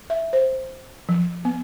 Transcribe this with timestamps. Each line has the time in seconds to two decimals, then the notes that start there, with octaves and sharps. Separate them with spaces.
0.10 E5
0.33 C5
1.09 F3
1.45 B3